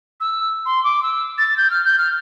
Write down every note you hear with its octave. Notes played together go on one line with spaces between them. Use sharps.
E6
C6
D6
E6
A6
G6
F6
G6
F6